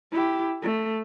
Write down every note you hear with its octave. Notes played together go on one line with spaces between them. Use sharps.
E4 G4
A3